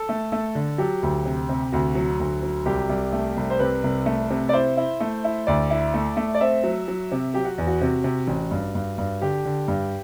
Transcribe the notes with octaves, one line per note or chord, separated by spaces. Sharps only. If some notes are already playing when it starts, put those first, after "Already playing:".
Already playing: A4
A3
A3
D3
F#3 G4
D2
C3
C3
D2 F#4
F#3
D2
F#3
C2 G4
C2
A3
C2
C5
C3 B4
C2
A3
C3
D5
E4 C5
E4
A3
E4
D2 D5
E4
A3
A3
D5
C4 E5
F#3
F#3
C3
F#3 G4
F#4
E2
F#4
C3
C3
A1
G2
G2
G2
D3 G4
D3
G2